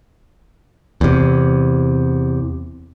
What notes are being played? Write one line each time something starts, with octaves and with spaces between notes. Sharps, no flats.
E2 C3